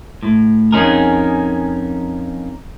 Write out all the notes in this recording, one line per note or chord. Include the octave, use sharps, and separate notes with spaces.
A2
F2 G#2 C#4 D#4 G#4 A#4